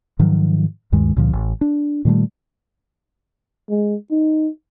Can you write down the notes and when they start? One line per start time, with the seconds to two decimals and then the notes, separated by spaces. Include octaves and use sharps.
0.19 G#2 D#3 F3 F#3
0.92 D2 G2 D#3 G#3
1.16 C#2 A#2 D3 F3
1.33 A1
1.61 D4
2.05 A#2 D#3 G3 A3
3.70 G#3
4.11 D#4